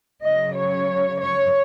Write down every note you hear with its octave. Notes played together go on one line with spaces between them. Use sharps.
C#3 F#3 D#5
C#5
C#5